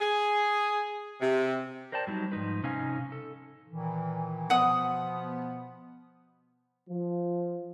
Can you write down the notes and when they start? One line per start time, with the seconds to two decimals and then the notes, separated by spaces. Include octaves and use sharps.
0.01 G#4
1.21 C3
1.92 A#4 C5 D5 G5 A5
2.07 F#3 G3 D#4
2.32 G#2 F3 D#4 B4
2.63 C3 C#4 D#4 F5 G#5
3.12 A4
3.68 A#2 D#3 E3
4.50 B2 F3 B3 F#5 D#6
6.87 F3